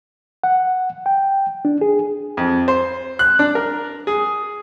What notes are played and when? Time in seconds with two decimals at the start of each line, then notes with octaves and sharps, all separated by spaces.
0.44 F#5
1.06 G5
1.65 D4
1.81 G#4
2.37 F2
2.68 C5
3.19 F#6
3.39 D4
3.55 A#4
4.07 G#4